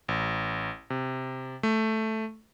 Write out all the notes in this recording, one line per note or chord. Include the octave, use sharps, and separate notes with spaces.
A1
C3
A3